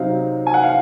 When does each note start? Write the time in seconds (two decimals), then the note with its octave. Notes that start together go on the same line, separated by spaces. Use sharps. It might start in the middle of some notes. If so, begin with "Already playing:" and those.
Already playing: C3 F#3 C4 D#4 F5
0.47 G#5
0.54 F#5
0.63 F5